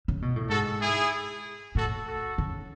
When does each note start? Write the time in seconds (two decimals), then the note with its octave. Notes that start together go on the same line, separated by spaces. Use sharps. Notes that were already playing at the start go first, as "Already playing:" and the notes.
0.08 C#3
0.22 B2
0.36 A2
0.49 G#2 F#4 A4
0.81 E4 G#4
1.75 A2 F#4 A4
2.06 F#4 A4
2.38 C#3